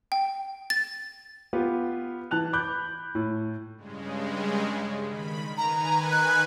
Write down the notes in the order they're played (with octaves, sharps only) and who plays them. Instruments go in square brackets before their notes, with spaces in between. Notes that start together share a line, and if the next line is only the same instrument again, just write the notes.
[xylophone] G5
A6
[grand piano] B3 F4 G4
E3 A5 F#6 F7
B5 D6 F#6 G6
A2
[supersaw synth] G2 C#3 G#3
D#3 B5
[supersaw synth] D#3 B4 G#5 [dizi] A#5
[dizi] F#6